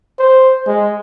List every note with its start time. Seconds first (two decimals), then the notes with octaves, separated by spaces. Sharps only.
0.19 C5
0.67 G#3